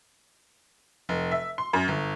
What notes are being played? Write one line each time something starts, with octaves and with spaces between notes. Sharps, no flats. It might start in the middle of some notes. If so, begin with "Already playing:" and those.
F1
E5
C6
F#2
G1